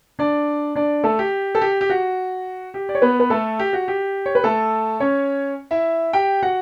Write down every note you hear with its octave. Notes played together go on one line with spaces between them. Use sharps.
D4 D5
D4 D5
A3 A4
G4
A4
G4
G4
F#4
G4
D5
C#5
B3 B4
B4
A3 A4
G4
F#4
G4
C#5
B4
A3 A4
C#4 C#5
E4 E5
G4 G5
F#4 F#5